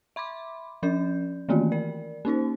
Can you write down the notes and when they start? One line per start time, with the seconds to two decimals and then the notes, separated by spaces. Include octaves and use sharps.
0.16 E5 B5 C6 D6
0.83 F3 C#4 D5 G6
1.49 D#3 E3 A3 A#3 F4
1.72 A#4 D5
2.25 A#3 C#4 D#4 C5